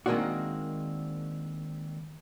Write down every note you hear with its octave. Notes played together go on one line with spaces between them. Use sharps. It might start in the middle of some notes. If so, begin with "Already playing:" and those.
D#3 G#3 A#3 C4 D4 F#4